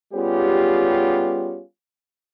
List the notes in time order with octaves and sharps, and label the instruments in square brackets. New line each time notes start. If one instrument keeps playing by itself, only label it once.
[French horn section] G3 B3 C#4 F4 G4 G#4